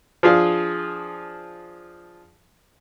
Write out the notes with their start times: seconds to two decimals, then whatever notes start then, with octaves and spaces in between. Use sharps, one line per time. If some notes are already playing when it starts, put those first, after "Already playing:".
0.23 F3 D4 F4 G#4 F5